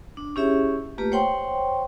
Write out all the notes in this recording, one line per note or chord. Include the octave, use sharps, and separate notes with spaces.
D4
C#4 E4 G4 G#4 C#5 E5
A3 A#3 F4 G4 B4
C5 C#5 F#5 G5 C6 C#6